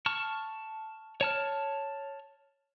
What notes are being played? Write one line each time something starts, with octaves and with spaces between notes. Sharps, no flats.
A5 C#6 F6
C#5 A5 F6